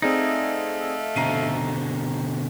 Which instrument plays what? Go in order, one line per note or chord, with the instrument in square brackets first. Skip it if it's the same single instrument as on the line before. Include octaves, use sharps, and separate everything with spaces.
[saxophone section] A3 E5 F5 [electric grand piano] C4 G#4 D5 [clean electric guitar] D#4
[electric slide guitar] B2 D3 C4 [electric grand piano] A#5 C7 D#7